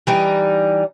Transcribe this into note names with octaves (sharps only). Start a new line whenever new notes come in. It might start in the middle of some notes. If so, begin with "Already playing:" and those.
E3 G3 D#4